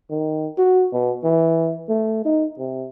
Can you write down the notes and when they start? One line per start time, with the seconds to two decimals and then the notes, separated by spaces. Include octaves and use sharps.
0.10 D#3
0.58 F#4
0.93 B2
1.24 E3
1.89 A3
2.25 D#4
2.59 C3